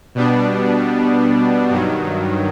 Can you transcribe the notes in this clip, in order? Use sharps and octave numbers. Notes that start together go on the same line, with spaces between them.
B2 G3 B3 D4
G2 D#3 F#3